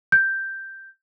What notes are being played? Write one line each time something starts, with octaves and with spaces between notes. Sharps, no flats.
G6